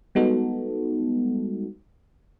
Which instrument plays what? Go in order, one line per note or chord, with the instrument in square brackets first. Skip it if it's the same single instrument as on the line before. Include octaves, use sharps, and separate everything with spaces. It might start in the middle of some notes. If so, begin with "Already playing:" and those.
[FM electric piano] G3 G#3 B3 D#4 F#4 A4